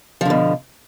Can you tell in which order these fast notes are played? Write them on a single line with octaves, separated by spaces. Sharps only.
F3 D3 B2